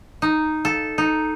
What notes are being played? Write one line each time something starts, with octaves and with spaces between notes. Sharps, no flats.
D#4
A4
D#4